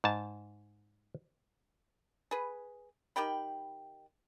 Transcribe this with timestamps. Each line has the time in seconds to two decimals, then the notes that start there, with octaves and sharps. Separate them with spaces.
0.04 G#2 A5
2.31 G#4 B4
3.16 D#3 G4 G5 B5